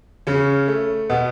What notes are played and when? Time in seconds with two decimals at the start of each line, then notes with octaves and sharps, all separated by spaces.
0.27 C#3 C#4
0.68 A3
1.09 B2 B3